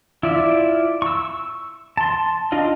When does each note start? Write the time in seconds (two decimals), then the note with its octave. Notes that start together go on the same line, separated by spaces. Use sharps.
0.23 E4 F4 D5 E5
1.02 C#6 E6
1.97 A5 C6
2.52 D4 D#4 F4 D#5